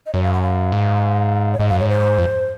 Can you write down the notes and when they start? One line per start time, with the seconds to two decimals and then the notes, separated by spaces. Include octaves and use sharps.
0.06 D#5
0.14 F#2 C#5
0.23 F5
0.33 F#5
0.42 F5
0.72 G#2
1.53 C#5
1.59 G#2 D#5
1.69 F#2 F5
1.79 G#2 C#5
1.89 C5
2.18 F2